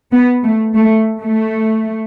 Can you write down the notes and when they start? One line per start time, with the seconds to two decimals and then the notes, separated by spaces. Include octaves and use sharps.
0.12 B3
0.43 A3
0.74 A3
1.21 A3